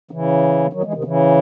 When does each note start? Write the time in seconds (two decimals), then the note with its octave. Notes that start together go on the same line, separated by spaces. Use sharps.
0.11 C#3 E3
0.73 D#3 F#3
0.84 E3 G#3
0.94 C3 D#3
1.04 C#3 E3